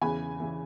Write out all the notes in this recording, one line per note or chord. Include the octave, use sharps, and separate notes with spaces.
E2 C#3 E3 G#5 B5
C#3 E3